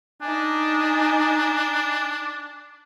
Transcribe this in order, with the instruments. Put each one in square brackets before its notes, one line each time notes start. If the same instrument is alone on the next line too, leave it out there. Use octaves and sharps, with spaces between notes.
[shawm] D4 [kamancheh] D#4 G#5